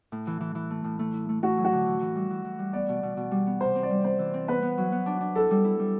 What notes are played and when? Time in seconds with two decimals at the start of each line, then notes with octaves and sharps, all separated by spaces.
0.12 A2
0.27 E3
0.41 E3
0.55 E3
0.70 A3
0.84 A2
0.99 A3
1.13 E4
1.29 A3
1.42 A3 F#4
1.58 F#3
1.64 F#4
1.72 D3
1.86 E3
2.01 E3
2.15 G3
2.30 E3
2.45 E3
2.59 G3
2.73 B3 D5
2.89 B2
3.03 B2
3.17 B2
3.31 G3
3.46 B3
3.61 C3 C5
3.75 C4
3.83 D5
3.91 G3
4.04 C4 C5
4.19 E3
4.34 C4
4.48 B3 B4
4.63 B3
4.78 F#3
4.92 B3
5.06 D4
5.21 D4
5.35 E4 A4
5.51 G3
5.64 E4
5.79 G3